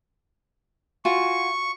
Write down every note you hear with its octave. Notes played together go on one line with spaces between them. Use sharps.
F4 F#4 G#5 C#6